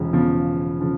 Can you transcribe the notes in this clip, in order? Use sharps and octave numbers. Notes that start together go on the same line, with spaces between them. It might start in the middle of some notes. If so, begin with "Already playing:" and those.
Already playing: E1 C#3 F3
E1 E2 C#3 F3
C#3 F3